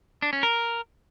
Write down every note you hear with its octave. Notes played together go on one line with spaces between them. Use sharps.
D4
C#4
A#4